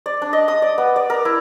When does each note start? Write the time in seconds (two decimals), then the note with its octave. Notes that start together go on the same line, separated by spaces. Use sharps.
0.06 D5
0.22 D4
0.33 D#5
0.48 D#6
0.62 D5
0.78 B3
0.96 D5
1.10 A#4
1.25 E4